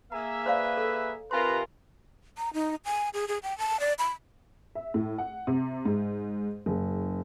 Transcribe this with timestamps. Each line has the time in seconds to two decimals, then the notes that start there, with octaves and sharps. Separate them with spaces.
0.12 A#3 G#4 E5 A#5
0.46 B4 C5 D5 F5
0.77 A4
1.31 C3 F4 A#4 B4 G#5 A#5 C6
2.38 A#5
2.54 D#4
2.85 G#5
3.14 G#4
3.28 G#4
3.43 G5
3.58 A5
3.80 D5
3.99 B5
4.75 E5
4.94 A2
5.18 F#5
5.47 C3
5.85 G#2
6.66 F#1